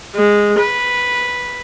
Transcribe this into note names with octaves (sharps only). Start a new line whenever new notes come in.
G#3
B4